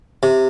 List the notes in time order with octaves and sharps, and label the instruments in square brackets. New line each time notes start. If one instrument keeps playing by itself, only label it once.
[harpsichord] C3